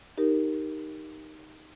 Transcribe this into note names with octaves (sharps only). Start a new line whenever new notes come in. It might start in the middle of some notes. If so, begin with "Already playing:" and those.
D#4 G4 A#4